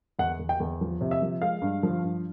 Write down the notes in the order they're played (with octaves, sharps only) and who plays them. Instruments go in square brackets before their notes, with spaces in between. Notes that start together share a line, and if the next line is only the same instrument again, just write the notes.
[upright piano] E2 F#5
E2
G5
E2
F3
C3
E5
F3
G#3 F5
G2
F3
G2